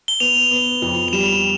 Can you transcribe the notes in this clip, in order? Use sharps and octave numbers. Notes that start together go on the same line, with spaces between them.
G7
B3 F7
B3
F2
F7
G3 E7